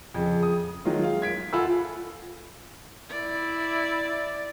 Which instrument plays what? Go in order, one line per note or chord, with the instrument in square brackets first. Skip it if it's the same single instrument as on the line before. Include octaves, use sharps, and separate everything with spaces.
[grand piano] F2 C#3
D#6
D#3 F#3 G#3 F4
F5
G#6 B6 D7
F4 A4 F#5 G#5 B5 E6
[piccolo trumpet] E4 [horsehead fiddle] D5